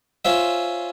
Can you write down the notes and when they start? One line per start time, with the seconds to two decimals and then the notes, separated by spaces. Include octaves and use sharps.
0.25 C#4 F4 C5 E5